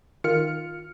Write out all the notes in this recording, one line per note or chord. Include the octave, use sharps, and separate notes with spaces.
D#3 F4 F6 C#7